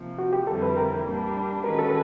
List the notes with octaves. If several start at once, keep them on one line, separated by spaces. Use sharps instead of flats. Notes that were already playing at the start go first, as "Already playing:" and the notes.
Already playing: C3 F3 A#3
F#4
G4
F2 D3 G3 C4 E4 A4
B4
A#4
A#2 G3 A#3 D4
D#3 G#3 C#4 F#4 A#4 B4
A4